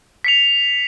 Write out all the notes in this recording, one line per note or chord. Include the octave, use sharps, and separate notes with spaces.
B6 C#7 F7